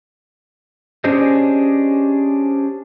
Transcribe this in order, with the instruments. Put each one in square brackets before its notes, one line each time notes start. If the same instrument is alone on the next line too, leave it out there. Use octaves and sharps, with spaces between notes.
[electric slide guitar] C#4 D4 G4 G#4 C5 D#5